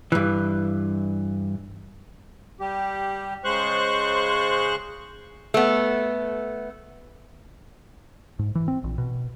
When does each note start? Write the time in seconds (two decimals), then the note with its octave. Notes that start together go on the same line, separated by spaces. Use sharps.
0.12 G2 E3
2.60 G3 G4
3.44 C#3 G#3 C5 C#6 F#6
5.54 A3 B3
8.39 G#2
8.55 E3
8.68 C4
8.84 A#1
8.98 B2